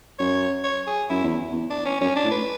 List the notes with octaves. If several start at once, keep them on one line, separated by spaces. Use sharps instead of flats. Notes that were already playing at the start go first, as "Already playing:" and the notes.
F#2 C#5
C#5
G#4
F#2 E4
E2
E2
D4
C#4
F#2 C#4
D4
A2
B4